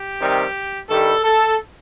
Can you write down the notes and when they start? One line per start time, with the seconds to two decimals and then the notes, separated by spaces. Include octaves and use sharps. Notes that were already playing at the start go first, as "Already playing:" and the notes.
Already playing: G4
0.19 C3 D#3 G3
0.89 G2 D#3 G3 A4
1.24 A4